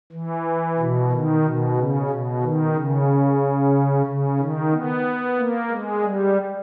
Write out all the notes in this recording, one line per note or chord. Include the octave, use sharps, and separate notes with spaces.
E3
B2
D#3
B2
C#3
B2
D#3
C#3
C#3
D#3
B3
A#3
G#3
G3